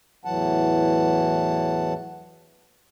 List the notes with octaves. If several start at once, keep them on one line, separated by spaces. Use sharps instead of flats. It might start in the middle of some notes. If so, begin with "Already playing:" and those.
E2 A2 E3 F#3 F#5 A5